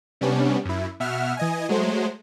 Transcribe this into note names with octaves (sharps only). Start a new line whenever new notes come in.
C3 G3 B3 C#4 D4
F#2 E4
B2 E5 F#5 F6
E3 D#5 G#5
F#3 G#3 A3 C5